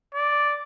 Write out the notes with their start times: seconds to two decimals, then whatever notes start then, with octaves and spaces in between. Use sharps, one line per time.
0.14 D5